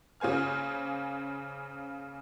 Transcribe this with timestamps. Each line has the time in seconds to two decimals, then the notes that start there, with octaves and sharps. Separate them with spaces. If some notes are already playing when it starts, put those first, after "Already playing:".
0.20 C#3 A#3 C5 G#5 F6